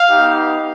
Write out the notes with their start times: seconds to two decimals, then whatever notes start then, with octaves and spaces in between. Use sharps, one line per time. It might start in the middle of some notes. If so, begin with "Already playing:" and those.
Already playing: F5
0.08 B3 D#4 G4